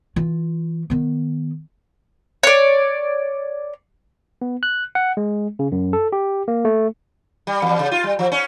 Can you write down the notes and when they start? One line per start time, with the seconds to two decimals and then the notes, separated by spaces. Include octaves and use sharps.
0.16 E3 F4
0.90 D#3 B3
2.43 C#5 D5
4.42 B3
4.63 F#6
4.95 F#5
5.17 G#3
5.59 C#3
5.72 F#2
5.93 A4
6.12 G4
6.48 A#3
6.65 A3
7.47 G3
7.62 E2
7.79 C#3
7.91 F4
8.04 G3
8.19 F3
8.32 C#4